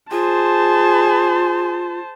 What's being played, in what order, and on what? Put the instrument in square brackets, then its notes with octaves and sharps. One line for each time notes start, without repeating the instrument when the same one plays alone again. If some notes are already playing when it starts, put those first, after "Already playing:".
[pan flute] F4 [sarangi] G#4 [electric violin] C5 A5